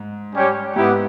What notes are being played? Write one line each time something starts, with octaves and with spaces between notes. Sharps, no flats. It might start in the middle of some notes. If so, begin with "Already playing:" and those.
Already playing: G#2
G3 C#4 G4 C#5
G#2 B3 E4 G4